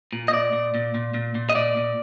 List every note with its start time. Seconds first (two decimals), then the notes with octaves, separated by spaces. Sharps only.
0.13 A#2
0.28 D#5
0.32 A#2 D5
0.53 A#2
0.75 A#2
0.94 A#2
1.14 A#2
1.35 A#2
1.49 D#5
1.55 A#2 D5
1.77 A#2